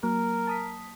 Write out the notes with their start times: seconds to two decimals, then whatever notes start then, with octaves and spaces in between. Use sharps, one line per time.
0.03 F#3 A#3 A#4
0.47 A5 D#6 B6